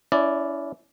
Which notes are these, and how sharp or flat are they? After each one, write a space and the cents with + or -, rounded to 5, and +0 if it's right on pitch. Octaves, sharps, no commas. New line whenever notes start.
C#4 +30 E4 +0 D5 +0